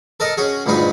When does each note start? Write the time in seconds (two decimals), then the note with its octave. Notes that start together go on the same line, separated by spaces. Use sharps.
0.20 A4 A#4 D#5 F#5
0.37 C#4 F#4 G#4
0.66 D2 G2 A#2 B3 D#4 G#4